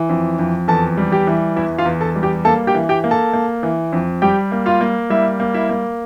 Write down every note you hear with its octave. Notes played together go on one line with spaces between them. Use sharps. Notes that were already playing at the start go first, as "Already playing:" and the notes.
Already playing: E3
F2
F2
E2 A4 A5
G3
G4 G5
E3
E2 E4 E5
F4 F5
E2
A4 A5
G3
G4 G5
A#3 A4 A5
G4 G5
E3
G4 G5
A#3
A4 A5
A#3
E3
F2
G3 G4 G5
A#3
F4 F5
A#3
G3 E4 E5
A#3
E4 E5
A#3